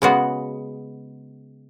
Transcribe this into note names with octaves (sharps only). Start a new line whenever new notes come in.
C#3 G#3 B3 F#4